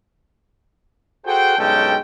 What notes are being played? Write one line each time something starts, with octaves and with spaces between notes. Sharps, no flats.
F#4 G#4 A4 C5 F#5 G5
B1 G2 G#3 C#4 A4 G5